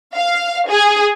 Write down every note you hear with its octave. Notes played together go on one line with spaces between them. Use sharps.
F5
G#4